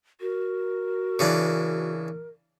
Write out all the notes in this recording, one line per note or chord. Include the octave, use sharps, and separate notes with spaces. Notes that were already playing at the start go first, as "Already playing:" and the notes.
F#4 A#4
C#3 E3 D4